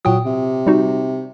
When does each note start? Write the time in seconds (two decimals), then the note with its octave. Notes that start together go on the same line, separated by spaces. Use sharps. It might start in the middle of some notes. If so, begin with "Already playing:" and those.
0.05 A#2 F#3 G5 D#6
0.26 C3
0.67 G3 D#4 F#4